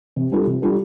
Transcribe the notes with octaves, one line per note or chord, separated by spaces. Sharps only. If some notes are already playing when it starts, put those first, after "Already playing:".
C3
G3 D4 F4 A4
C3
G3 D4 F4 A4